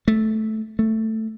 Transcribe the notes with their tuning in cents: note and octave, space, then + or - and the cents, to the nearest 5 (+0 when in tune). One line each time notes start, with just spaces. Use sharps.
A3 -10
A3 +10